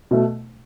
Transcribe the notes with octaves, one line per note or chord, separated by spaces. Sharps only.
B2 A3